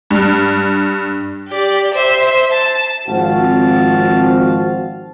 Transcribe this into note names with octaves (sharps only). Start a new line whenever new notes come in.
G2
G4 D5
C5 E5
A5
G#1 F3 C4 F#4 F5 A5